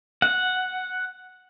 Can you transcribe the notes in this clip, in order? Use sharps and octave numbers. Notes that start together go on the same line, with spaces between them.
F#5